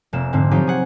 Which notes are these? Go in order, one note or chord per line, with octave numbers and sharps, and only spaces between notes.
F1 A#3 E7
G#2 D3 C4
F3 F#3 D#4 F4 G4
G#4 F#5